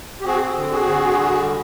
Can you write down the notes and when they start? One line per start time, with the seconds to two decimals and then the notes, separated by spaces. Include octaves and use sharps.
0.21 G4
0.25 C4 F#4 G#4
0.56 D3
0.71 F#4 G#4
0.87 D3
1.18 G3